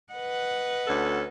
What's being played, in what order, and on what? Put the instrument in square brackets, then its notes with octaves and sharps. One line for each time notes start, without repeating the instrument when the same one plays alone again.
[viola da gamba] B4 D#5 [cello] F#5
[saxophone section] D2 C#4 A4